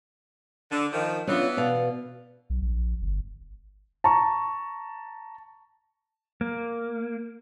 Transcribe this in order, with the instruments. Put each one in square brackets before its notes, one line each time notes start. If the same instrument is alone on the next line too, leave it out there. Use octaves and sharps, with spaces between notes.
[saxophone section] D3
D#3 F3
[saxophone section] E3 B3 [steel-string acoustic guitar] C#4 D4 F4
[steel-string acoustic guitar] B2 D5 F5
[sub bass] B1
A#1
G1
[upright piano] A5 A#5 C#6
[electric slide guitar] A#3